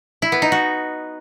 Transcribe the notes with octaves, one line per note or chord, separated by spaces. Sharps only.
E4
B3
D#4
F#4